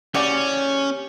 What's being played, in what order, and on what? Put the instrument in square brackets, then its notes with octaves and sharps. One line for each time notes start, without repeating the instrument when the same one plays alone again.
[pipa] C#3 F#4 D5 [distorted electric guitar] C#4 [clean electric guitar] G4 C#5